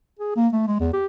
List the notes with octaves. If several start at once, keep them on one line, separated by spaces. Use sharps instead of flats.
G#4
A#3
A3
G#3
E2
G4